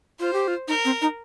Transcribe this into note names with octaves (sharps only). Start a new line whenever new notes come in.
F4 C5
G4
F4
D#4 A#4
C4
D#4